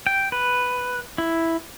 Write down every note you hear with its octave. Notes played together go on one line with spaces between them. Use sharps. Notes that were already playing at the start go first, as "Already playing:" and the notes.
G5
B4
E4